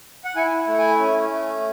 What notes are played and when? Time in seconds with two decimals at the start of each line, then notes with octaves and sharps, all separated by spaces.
0.25 F#5
0.36 E4 G#5
0.67 A3
0.78 G#5
0.99 C#4
1.29 A3